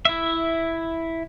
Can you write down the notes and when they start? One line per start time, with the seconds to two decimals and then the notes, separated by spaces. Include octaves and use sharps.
0.05 E4 E5